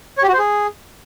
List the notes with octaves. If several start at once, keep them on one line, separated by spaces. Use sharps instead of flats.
C#5
G4
F#4
C5
G#4